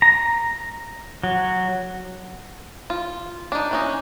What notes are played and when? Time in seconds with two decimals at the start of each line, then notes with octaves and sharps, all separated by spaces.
0.02 A#5
1.24 F#3
2.90 F4
3.52 D4 D#4
3.71 E3 C#4 D#4